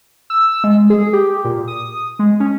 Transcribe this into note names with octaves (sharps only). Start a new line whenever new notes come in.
E6
G#3
G#4
G4
A#2
D#6
G#3
C#4